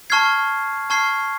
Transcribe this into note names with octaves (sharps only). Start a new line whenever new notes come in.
A5 C#6 F6 G#6 C7
A5 C#6 F6 G#6 C7